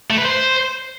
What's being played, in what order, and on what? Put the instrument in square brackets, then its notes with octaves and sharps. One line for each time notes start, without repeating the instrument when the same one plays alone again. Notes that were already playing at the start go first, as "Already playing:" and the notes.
[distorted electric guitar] A3
B4
C5